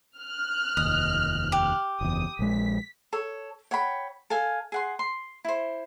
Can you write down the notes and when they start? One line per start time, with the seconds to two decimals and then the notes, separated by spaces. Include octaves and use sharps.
0.20 F6 F#6
0.77 F1 D#2 D#5
1.52 G4
2.01 F#1 E2 D#6
2.39 A#1 G#3 B6
3.13 A4 C#5
3.71 C#5 F#5 G5 B5
4.30 A4 F5 G#5
4.72 G#4 F#5 C6
4.99 C6
5.45 E4 C5